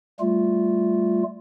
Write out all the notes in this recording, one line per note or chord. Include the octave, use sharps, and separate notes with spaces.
G3 A3 F4